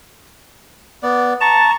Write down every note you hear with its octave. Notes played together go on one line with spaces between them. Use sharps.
B3 D5
A5 A#5 C#6